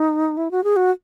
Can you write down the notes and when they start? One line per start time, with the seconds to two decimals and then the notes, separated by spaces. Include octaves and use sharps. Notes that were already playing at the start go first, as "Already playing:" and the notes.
Already playing: D#4
0.37 E4
0.51 F#4
0.64 G#4
0.76 F#4